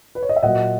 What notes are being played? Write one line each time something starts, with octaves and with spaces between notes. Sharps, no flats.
B4
C#5
D#5
E5
A#2 F#3 D#5 F#5